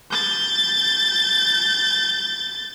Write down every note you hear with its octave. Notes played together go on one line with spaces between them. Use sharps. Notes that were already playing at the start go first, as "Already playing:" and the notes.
G6 A6